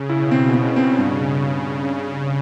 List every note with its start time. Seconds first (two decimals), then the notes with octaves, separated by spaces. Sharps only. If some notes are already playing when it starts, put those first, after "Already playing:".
Already playing: C#3
0.09 B2 E4
0.31 C4
0.53 C#3 C4
0.76 C4
0.98 G2 C#3